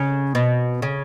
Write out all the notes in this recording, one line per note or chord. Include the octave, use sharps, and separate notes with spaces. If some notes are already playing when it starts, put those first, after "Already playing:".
Already playing: C#3
B2
C#3